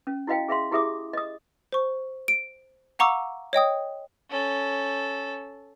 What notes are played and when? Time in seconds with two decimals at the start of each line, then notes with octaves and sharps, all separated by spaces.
0.07 C#4
0.27 E4 F#4 D#5 F5 G5
0.48 G#4 E5 F5 C6
0.71 E4 G4 G#4 E5 D6 D#6
1.13 D#5 D#6
1.72 C5 C#6
2.28 D7
2.99 F5 F#5 A#5 C#6 D6 E6
3.53 C#5 D#5 G5 D#6
4.30 C#4 A4